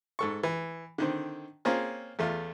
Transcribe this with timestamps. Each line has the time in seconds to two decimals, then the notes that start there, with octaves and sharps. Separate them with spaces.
0.19 G#2 A4 C#6
0.43 E3
0.98 D3 D#3 C4
1.65 A#3 C4 C#4 F4 G#4
2.19 E2 A3 F4